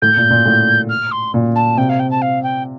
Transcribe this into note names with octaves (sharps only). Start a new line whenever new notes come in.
A2 G6
A#2
A#2
A2
F6
C6
A#2
A5
C3 G5
F5
G5
A5
F5
G5